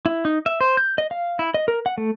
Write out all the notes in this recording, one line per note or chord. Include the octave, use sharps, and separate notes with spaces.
E4
D#4
E5
C5
G6
D#5
F5
E4
D#5
A#4
F#5
A3